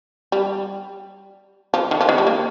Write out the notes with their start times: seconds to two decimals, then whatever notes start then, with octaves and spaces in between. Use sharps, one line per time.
0.32 G3
1.74 F3
1.91 D#3
2.01 F3
2.09 D#3
2.18 G3
2.27 A#3